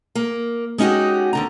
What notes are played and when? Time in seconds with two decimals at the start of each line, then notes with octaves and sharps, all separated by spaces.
0.15 A#3
0.78 G#3 C#4 D#4 F#4 G4
1.33 D#2 D3 A#5